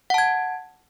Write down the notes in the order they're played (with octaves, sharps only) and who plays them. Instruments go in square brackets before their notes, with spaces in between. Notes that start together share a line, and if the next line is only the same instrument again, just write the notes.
[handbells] F#5
A5
G#6